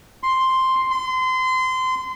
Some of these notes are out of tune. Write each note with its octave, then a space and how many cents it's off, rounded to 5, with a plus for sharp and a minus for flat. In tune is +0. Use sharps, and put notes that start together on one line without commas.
C6 +0
C6 -25